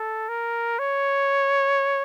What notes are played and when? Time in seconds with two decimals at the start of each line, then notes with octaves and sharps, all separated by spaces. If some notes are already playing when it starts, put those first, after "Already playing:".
Already playing: A4
0.29 A#4
0.79 C#5